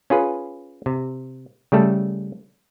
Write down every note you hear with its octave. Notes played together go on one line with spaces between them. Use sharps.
C#4 F4 G#4 B4
C3
C#3 G3 A3 A4